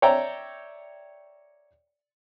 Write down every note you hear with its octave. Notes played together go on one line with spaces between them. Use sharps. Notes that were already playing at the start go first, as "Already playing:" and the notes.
C#5 D5 E5 G5 A#5